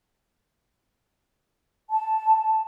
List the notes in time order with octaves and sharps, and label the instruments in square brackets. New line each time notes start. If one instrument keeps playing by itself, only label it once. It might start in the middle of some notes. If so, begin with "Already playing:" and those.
[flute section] A5